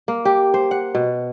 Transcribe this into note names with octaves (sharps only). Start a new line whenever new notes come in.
A#3
G4
C5
F#5
B2